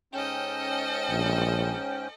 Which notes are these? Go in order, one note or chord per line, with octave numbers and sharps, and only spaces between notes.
G#2 C#4 A4 D#5 G5
A#1